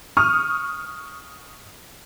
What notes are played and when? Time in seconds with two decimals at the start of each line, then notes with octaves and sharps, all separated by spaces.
0.17 C#6 D#6 F6